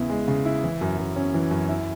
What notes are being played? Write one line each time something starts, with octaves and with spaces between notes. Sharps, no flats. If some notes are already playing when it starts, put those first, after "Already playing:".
Already playing: E2 C#3 E4
G#3
C#3
E4
E3
F#2
F#2
C#4
E3
F#2
E4